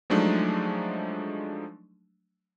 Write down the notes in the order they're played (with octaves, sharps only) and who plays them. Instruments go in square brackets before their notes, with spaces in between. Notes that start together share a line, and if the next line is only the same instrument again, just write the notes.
[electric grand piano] F3 F#3 G#3 A3 D4 D#4